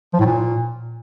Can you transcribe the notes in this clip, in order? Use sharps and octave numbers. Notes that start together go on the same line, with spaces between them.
F3
A2
A#2